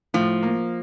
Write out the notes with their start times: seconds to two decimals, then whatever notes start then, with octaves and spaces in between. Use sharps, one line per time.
0.14 A2 F3
0.43 A#3